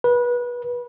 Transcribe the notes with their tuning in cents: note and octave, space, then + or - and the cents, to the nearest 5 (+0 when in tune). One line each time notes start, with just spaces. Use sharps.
B4 -25